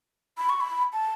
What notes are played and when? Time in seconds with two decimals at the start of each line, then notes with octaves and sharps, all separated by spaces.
0.38 B5
0.49 C#6
0.61 B5
0.93 A5